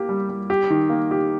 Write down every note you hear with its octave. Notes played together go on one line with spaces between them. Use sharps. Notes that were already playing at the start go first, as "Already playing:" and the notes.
Already playing: A#3 G4
G3
G3
G4
D#3
A#3
G4